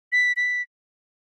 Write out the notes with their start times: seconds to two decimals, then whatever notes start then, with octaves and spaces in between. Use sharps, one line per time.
0.12 B6
0.37 B6